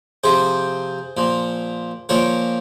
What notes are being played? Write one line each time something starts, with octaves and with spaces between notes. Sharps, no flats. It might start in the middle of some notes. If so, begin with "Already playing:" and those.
C3 F3 G#4 C5
A#2 F3
A#2 F3 A#4 C#5